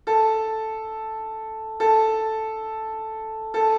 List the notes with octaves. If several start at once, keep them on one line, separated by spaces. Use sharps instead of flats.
A4
A4
A4